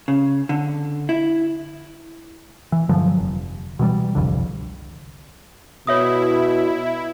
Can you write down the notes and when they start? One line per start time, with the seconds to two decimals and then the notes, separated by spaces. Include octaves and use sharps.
0.08 C#3
0.49 D3
1.09 E4
2.72 E3
2.89 G2 D3 F3 F#3
3.19 F1
3.79 B2 E3 F#3 G3
4.15 G1 C2 F2 D3
5.87 B2 E4 C#5 E5 D#6